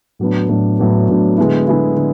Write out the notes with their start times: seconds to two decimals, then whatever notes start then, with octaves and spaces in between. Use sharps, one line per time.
0.19 A2 F#3 B3 D4
0.49 A2 F#3 B3 D4
0.79 A2 F#3 B3 D4
1.09 A2 F#3 B3 D4
1.37 D3 G#3 B3 E4
1.68 D3 G#3 B3 E4
1.97 D3